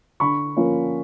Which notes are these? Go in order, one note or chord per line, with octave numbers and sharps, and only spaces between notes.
D3 B5 C#6
F3 A#3 C#4 F4